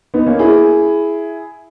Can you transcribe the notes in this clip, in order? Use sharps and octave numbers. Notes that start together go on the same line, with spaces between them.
B3 D#4
A#3 C#4
E4 G#4